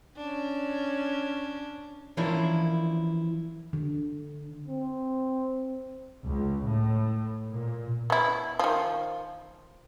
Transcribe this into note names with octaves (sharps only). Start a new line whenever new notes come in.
C#4 D4
E3 F3 A#3 C#4 D4 E4
D3
C4
C#2
A2
A#2
B3 E4
D#3 F3